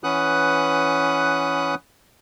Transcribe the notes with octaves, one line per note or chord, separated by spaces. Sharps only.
E3 C#4 B4 F#5 D#6 F#6